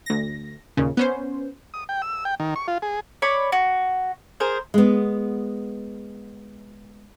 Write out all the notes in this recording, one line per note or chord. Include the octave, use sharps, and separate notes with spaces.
D2 A#6
D#2 A#2 C#3
B3 C#4 C5
D#6
G5
E6
G5
D#3
C#6
F4
G#4
C#5 D5 B5
F#4
G#4 A#4 C5
G#3 B3